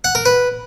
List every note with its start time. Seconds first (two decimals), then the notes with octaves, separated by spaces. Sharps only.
0.04 F#5
0.15 A#4
0.26 B4